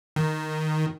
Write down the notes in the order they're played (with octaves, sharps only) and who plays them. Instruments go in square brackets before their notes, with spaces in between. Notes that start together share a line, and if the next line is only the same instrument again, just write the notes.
[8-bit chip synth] D#3